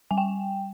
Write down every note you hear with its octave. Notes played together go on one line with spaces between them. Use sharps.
G3 G#5
G5